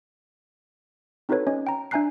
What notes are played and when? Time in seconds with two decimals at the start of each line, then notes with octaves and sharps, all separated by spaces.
1.29 C4 D#4 F#4 A4 B4 C#5
1.47 C#4 C#5 D#5
1.67 G5 A#5
1.91 D4 E5 G#5 A#5 F#6 C7